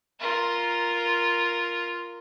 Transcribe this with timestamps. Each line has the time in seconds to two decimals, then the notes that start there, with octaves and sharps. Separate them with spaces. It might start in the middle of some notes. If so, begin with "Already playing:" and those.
0.20 F4 A#4